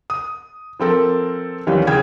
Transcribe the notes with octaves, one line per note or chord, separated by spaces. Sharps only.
D#6
F3 C4 A4 A#4
D#2 E3 G3 C#4
C#3 G5 G#6